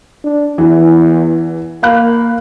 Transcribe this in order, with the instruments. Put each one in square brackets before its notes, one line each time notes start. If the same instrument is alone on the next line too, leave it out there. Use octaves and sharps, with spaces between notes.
[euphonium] D4
[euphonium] E2 [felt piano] E3
[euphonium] A#3 [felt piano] F5 B5 F#6